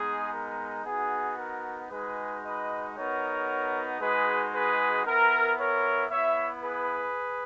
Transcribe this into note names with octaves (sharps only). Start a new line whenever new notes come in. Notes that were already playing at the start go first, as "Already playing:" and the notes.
Already playing: G#3 B3 D#4 G#4
A#4
B3 D#4 F#4 G#4
A#4
G#3 D#4 F#4 G#4 B4
B4 D#5
B3 D#4 F#4 A#4 C#5
G#3 D#4 F#4 G#4 B4
G#4 B4
B3 E4 A#4
A#4 C#5
B3 E4 C#5 E5
G#4 B4